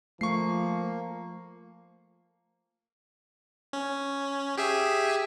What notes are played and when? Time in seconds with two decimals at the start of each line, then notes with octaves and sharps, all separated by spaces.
0.21 F3 A3 A#3 C#6 C7
3.73 C#4
4.57 G4 G#4 E5